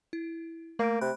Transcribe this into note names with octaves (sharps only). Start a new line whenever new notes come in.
E4
A3 A#3 D7
C3 B5 F#6